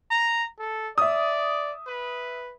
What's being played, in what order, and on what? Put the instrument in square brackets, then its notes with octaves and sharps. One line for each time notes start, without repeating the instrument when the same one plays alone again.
[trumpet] A#5
A4
[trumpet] D5 [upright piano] E5 D#6
[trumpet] B4